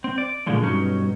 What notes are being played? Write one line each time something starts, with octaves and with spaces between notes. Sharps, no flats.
C4
D5
A#2 D3 F3 G#3 A3
B1 G2 F#3 C#4 D#4